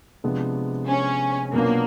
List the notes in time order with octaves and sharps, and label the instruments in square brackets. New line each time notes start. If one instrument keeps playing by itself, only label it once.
[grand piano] C3 F3 G#3 B3 D4
[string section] C#4
[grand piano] B2 F#3 B3 D4 F4 [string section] A#3